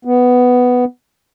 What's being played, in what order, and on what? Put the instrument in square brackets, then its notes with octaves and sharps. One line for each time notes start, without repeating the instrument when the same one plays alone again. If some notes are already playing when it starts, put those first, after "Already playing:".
[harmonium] B3